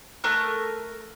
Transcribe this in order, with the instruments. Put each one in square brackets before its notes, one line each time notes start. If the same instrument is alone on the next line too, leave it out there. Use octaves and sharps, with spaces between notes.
[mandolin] A3 A#4 C#6 F#6